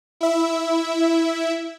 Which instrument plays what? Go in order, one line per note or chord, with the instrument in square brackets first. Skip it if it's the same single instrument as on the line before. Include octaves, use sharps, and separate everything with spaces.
[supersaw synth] E4 E5